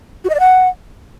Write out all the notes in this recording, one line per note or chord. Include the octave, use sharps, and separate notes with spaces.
F#4
D#5
D5
F#5